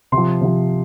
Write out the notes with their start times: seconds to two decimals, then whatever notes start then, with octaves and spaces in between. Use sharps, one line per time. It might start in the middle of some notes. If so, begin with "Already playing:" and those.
0.12 C3 C6
0.17 F3
0.41 C3 F3